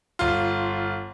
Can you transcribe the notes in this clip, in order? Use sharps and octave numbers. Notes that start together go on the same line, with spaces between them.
G1 F4